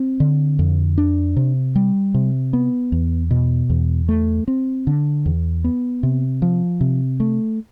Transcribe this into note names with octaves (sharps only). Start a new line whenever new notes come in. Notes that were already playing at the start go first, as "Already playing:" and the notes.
Already playing: C4
D3
F2
D4
C3
G3
C3
B3
E2
B2
E2
A3
C4
D3
E2
B3
C3
F3
C3
A3